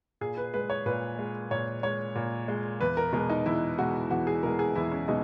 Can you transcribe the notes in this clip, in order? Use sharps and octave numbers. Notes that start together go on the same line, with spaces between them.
A#2 G#4
B4
G#3 B4
C#5
A#2 B4
G#3
A#2 C#5
G#3 C#5
A#2
G#3
E2 B4
A#4
B2 G#3 A#4
D#4
E2 E4
B2 G#3 F#4
E2 F#4
G#4
B2 G#3 A#4
G#4
E2 E4
C#4
B2 G#3 D#4